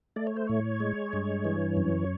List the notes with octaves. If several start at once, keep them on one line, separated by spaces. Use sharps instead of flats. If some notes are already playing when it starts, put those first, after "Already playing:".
A3 D5
C#5
C5
A2 C#5
G#3
G2
E3
F#2